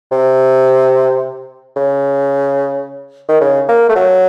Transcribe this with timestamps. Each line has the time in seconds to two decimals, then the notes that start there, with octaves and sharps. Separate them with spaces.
0.12 C3
1.76 C#3
3.29 D#3
3.41 C#3
3.69 A#3
3.89 A3
3.96 F#3